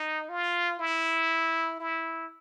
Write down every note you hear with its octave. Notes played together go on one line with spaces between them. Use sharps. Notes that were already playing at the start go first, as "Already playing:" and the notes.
Already playing: D#4
F4
E4
E4